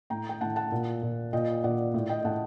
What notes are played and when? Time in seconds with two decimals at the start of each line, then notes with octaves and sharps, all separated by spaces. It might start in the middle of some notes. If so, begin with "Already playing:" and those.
0.10 A2 G5 A#5
0.29 G5
0.41 A2 F#5 A5
0.56 F#5 A5
0.72 A#2
1.02 A#2
1.33 A#2 D#5 G5
1.64 A#2 D5 F#5
1.94 A2
2.09 D#5 G5
2.25 A2 F#5 A5